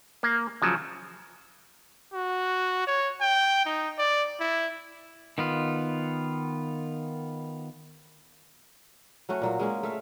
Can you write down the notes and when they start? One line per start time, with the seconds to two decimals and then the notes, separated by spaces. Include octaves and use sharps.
0.23 A#3
0.62 C#3 F3 F#3
2.13 F#4
2.87 C#5
3.21 G5
3.65 D#4
3.99 D5
4.40 E4
5.38 D#3 B3 F4
9.29 F#3 A3 C#4 F#4
9.42 A#2 F#3 A#3
9.59 G#3 A#3 C#4
9.83 A3 E5 F5